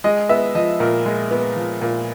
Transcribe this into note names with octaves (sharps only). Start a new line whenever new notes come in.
G#3 D#5
B3 E5
F3 D#5
A#2 A#4
G#3
B3
F3
A#2